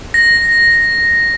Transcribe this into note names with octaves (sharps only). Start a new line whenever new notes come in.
A#6